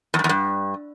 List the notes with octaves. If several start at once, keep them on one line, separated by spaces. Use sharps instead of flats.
E2
G2
E2
G2